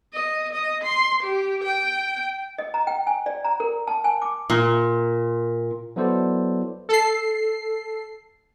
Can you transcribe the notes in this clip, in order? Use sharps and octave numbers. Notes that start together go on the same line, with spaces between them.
D#5
D#5
C6
G4
G5
D#5
A#5
G5
G#5
D5
A#5
A#4
A5
G#5
D6
A#2
F#3 B3 E4 A4 C5 D5
A4 C7